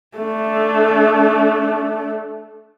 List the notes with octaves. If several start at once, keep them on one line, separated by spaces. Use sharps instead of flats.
A3 D4